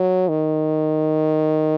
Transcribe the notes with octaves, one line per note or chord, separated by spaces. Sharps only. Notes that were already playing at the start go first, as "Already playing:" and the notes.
Already playing: F#3
D#3